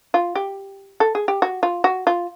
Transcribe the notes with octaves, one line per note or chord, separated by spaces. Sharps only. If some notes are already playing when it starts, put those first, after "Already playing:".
F4
G4
A4
G#4
G4
F#4
F4
F#4
F4